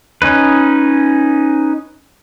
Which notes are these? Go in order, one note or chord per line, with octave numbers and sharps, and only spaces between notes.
C#4 D#4 B4